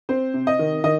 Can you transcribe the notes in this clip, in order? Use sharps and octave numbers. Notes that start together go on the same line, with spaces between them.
C4 C5
C3
D#5
D#3
D#3 D#5